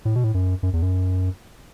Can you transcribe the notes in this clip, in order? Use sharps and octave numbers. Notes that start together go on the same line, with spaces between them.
A2
B2
A2
F#2
F#2
E2
F#2